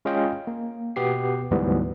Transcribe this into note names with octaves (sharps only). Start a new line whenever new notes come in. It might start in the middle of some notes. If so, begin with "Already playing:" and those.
G#3 C#4 F4 D#5 F5 G5
A#3
B2 B3 G4 C7
D2 G#2 E3 F#3 G3 B3